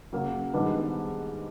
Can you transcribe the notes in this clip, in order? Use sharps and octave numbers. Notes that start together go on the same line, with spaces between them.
C#3 F#3 A#3
G#2 D#3 G3 B3 D4